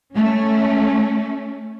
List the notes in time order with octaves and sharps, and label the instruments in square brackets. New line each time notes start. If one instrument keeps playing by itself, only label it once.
[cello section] A3 C#4